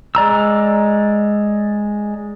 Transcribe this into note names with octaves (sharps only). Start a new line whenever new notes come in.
G#3 D5 A#5 E6